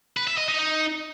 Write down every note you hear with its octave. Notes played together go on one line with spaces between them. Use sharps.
B4
E5
D#5
D#4
D#4